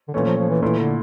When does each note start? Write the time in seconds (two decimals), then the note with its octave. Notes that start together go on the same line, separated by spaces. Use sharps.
0.08 D3
0.14 A#2 E3 A3 C#4
0.26 F3
0.38 F3
0.49 E3
0.62 A#2 E3 A3 E4
0.79 D3